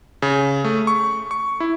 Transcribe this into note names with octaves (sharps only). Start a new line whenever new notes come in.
C#3
A3
C#6
C#6
E4